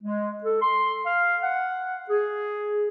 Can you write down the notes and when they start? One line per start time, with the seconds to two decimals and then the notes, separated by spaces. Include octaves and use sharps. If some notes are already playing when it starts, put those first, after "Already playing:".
0.03 G#3
0.44 A4
0.61 C6
1.05 F5
1.43 F#5
2.10 G#4